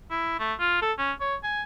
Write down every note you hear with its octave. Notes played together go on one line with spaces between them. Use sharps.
E4
A3
F4
A4
C#4
C#5
G#5